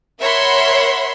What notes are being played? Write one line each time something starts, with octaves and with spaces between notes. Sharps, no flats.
A#4 C#5 E5 F#5 B5 C6